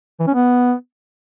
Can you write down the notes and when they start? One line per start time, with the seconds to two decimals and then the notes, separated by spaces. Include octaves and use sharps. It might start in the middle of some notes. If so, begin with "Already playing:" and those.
0.20 E3
0.27 C#4
0.34 B3